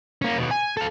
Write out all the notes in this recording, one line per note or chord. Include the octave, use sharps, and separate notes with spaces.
A#3 C#4
D#2 B2
G#5
A4 F5